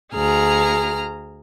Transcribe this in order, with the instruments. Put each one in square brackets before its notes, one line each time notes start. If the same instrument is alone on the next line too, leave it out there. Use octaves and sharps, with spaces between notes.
[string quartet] D2 G#4 A#5 F6